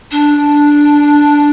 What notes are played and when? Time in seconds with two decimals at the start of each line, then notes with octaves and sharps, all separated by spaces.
0.11 D4